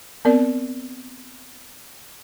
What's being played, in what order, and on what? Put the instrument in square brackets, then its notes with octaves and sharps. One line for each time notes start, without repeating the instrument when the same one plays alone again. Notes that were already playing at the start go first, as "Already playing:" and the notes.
[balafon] B3 C4 A#4 D5